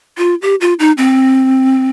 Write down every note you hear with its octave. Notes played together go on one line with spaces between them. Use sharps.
F4
G4
F4
D#4
C4